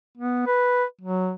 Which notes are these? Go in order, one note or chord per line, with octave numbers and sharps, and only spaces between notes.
B3
B4
F#3